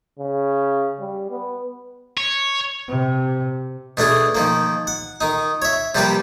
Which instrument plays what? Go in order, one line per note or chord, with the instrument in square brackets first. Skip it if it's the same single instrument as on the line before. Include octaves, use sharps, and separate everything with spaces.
[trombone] C#3
G3
B3
[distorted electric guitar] C#5
[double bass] C3
[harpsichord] B2 A3 D4 G#4
D#3 F3 A#3
F#5
D#3 D#4
C#5 E5
C3 F3 G3 A#3 G4 B4